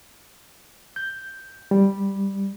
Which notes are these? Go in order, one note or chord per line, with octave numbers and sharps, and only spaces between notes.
G6
G3